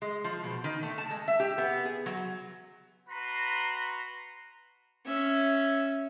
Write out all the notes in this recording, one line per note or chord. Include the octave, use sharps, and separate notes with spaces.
G#3
F3
B2
D#3
A3
A5
G#3
E5
G4
B3
G#4
F#3
F#4 B4 A#5 C6
C#4 E5